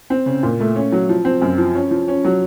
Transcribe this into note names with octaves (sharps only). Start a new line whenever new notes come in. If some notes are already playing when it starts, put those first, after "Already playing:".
C4
C#3
A#2
A3
C#4
F#3
F3
C4
F#2
F3
C#4
F3
C#4
F#3